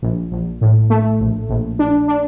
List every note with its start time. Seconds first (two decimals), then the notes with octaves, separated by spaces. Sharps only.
0.02 A#1
0.31 A#1
0.61 A2
0.90 A3
1.20 A#1
1.49 A#1
1.79 D4
2.08 D4